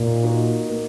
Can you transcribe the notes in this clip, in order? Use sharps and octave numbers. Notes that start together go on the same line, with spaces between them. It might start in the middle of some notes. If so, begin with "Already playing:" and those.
Already playing: A#2 A#3 D#4 A#4
D#4 F#4 A#4
A#3